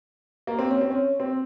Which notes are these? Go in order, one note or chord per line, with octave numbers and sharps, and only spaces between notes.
A#3
C4
C#4
C4
C#4
C4